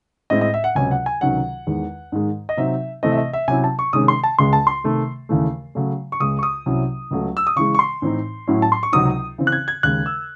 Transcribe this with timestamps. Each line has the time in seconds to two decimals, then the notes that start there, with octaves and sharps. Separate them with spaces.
0.30 A2 G#3 C4 E4 D#5
0.41 D#5
0.54 E5
0.64 F#5
0.75 C#2 C3 F#3 C#4 G#5
0.91 F#5
1.06 G#5
1.21 C#2 C3 D#3 F#3 C#4 F#5
1.67 E2 D#3 G#3
2.12 G#2 D#3 G#3
2.49 D#5
2.57 C3 F#3 C4 D#4 E5
3.03 C3 E3 A3 C4 D#5
3.12 E5
3.18 D#5
3.33 E5
3.48 C3 F#3 C#4 E4 G#5
3.64 A5
3.79 C#6
3.93 C3 D#3 G#3 C#4 D#6
4.08 C6
4.24 A5
4.38 C#2 C#3 G#3 C6
4.53 A5
4.67 C6
4.84 C3 D#3 A3
5.29 D#2 C#3 E3 A3
5.75 C#3 F#3 A3 C#4
6.12 C#6
6.20 C#2 C#3 G#3 D#6
6.39 C#6
6.43 D#6
6.66 C2 C3 F#3 C#4 E4
7.11 C#2 C#3 F#3 A3
7.37 E6
7.47 D#6
7.56 C#3 E3 G#3 C#6
7.75 C#6
7.79 C6
8.02 A2 E3 C4 D#4
8.47 A2 F#3 C#4 E4
8.62 A5
8.72 C6
8.83 C#6
8.92 C#2 C3 F#3 C4 D#4 D#6
9.38 C#3 E3 C4
9.47 F#6
9.52 G#6
9.68 G#6
9.83 D#2 C#3 G#3 F#6
10.06 E6